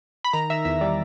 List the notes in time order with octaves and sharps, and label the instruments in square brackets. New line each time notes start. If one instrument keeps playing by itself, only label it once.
[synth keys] B5
D#3 A#5
D#3 E5
E2 E5
G3 D5